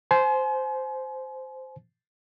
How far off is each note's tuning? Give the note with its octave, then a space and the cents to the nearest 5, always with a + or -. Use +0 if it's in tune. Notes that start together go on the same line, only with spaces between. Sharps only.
C5 -5 G#5 +40